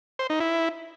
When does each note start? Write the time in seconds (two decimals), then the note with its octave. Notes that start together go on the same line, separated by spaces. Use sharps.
0.19 C5
0.30 D#4
0.40 E4